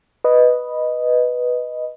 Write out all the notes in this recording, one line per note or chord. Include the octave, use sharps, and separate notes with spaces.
B4 D#5